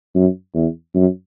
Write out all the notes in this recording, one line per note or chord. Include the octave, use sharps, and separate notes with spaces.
F#2
E2
F#2